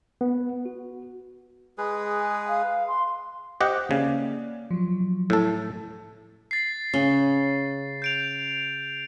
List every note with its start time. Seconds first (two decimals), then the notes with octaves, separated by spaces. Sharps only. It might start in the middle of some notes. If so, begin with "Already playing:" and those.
0.21 B3
0.65 F#4
1.78 G#3 G#4 B4
2.21 G#5
2.48 F5
2.88 C6
3.61 G4 C5 D#5 F#5
3.91 C#3 A#3 D5
4.71 F3 F#3
5.30 A2 A4
6.51 A6 C7
6.94 C#3 C#4
8.02 G6 D7 F7